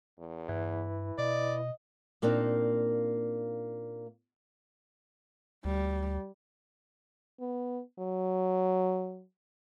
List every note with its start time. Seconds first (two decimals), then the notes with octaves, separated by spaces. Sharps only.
0.19 E2
0.49 G2 E4 B4
1.18 B2 D5 D#5
2.22 A#2 A#3 C4 D4 D#4
5.65 D2 G3
7.40 B3
7.99 F#3